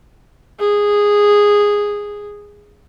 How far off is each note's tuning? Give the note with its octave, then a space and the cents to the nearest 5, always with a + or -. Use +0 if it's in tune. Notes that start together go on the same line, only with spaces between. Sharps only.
G#4 -10